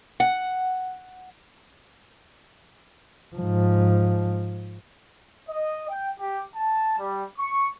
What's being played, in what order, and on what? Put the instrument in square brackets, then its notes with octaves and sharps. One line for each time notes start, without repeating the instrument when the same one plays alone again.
[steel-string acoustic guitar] F#5
[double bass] G#2 F3
[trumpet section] D#5
G5
G4
A5
G3
C#6